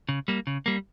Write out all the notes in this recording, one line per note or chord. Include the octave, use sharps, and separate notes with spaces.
C#3
G3 A#3
C#3
G3 A#3